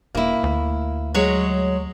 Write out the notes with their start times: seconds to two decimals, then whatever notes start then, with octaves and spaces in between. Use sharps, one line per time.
0.15 E1 A#3 E4
0.44 D2
1.14 F#3 G#3 C#5